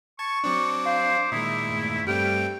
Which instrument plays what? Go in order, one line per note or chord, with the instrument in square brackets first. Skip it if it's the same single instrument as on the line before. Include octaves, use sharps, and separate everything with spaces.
[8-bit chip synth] A5 G#6 [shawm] C#6
[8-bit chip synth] F#3 C4 D4 [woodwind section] D6 [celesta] C#7
[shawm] C5 [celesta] F5
[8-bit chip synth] A#2 D#3 G#3 [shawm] E4 [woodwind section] E5 A#5 [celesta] D#6
[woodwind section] E2 G2 A3
[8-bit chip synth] G2 A3 C4 [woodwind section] G3 F6 [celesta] G4 [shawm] G5